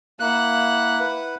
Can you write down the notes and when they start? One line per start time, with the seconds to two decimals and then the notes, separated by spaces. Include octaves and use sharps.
0.20 A#3 E4 F#5 F#6
1.00 B4